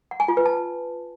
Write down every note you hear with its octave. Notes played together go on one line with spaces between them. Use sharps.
F#5
G#5
F4
B4
A5